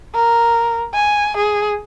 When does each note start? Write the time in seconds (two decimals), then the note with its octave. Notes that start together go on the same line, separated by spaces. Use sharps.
0.14 A#4
0.94 G#5
1.37 G#4